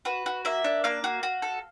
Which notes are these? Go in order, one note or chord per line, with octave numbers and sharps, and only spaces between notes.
F#4 B4
F#4
A#3 E5
D4
A#3 F5
F#4
F#4
A4